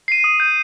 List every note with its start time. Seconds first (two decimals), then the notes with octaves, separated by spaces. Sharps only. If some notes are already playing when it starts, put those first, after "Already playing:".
0.08 C7 D#7
0.24 D#6
0.40 G6 D#7